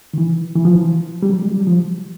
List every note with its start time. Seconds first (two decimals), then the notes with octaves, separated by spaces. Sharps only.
0.14 D#3
0.18 E3
0.56 E3
0.65 F3
0.76 E3
1.23 G3
1.30 F#3
1.42 G#3
1.54 G3
1.67 F3